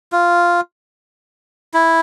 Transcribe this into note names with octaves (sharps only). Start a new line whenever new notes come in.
F4
E4